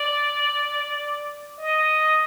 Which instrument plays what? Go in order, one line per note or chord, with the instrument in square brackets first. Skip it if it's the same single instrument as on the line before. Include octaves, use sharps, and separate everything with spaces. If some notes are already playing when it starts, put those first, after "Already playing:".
Already playing: [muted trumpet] D5
D#5